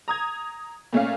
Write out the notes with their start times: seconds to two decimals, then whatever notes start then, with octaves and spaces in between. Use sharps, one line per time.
0.08 A#5 D#6 G#6
0.93 A#2 A3 C#4 F5